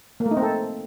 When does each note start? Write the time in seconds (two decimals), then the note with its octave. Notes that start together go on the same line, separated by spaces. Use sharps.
0.20 A#3
0.26 A3
0.31 D#4
0.37 C4
0.42 A4